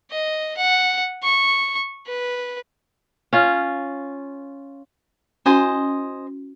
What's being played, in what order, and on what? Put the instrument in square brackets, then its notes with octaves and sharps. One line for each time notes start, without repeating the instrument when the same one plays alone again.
[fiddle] D#5
F#5
C#6
B4
[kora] C#4 F4
[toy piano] C#4 E4 F#4 [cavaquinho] C5 D#5 G#5